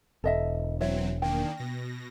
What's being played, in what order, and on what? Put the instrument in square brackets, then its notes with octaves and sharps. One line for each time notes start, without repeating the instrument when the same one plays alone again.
[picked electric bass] E1 [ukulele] A4 D#5 E5
[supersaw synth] E3 F#3 C4 [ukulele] C#5 E5
[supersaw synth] D#3 A#3 D4 [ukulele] G5
[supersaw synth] B2 A#6